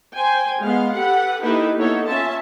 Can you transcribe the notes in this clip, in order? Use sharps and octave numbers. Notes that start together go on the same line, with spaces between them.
C5 G5 G#5
G#3 B3 F5
G4 A4 B4 F#5
A#3 D#4 E4 G4 A4 B4
A#3 B3 D#4 E4 A4 C#5
C#4 F4 E5 A5